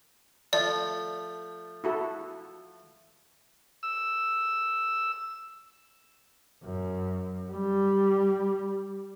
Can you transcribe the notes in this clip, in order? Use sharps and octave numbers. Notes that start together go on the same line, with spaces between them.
F3 A3 D5
E4 F#4 A4
E6
F#2
G3